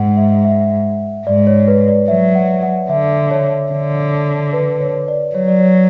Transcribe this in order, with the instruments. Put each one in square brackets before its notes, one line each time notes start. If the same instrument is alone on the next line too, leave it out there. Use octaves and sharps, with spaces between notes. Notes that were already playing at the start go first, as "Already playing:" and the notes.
Already playing: [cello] G#2 [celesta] F#5
[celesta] E5
E5
[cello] G#2 [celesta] D5
[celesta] C#5
B4
D5
[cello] F#3 [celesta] E5
[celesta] F#5
F#5
[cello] D3 [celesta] E5
[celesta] C#5
[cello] D3
[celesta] B4
C#5
D5
[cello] F#3 [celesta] C#5
[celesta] D5
C#5